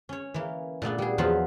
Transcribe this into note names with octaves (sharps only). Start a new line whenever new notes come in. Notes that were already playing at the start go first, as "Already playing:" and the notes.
C#4 C#5
E3 A#3
A#2 A3 B3 D4
G3 G#4
E2 F3 F#3 B3 F4 B4